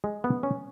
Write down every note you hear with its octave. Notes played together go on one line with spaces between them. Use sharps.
G#3
B3
C#4